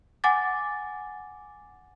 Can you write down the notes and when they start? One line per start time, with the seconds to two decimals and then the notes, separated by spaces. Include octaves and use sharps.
0.24 F#5 G#5 D6 A6